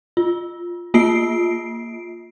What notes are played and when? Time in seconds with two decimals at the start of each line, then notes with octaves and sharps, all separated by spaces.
0.17 F4
0.94 A#3 F4 C7 D7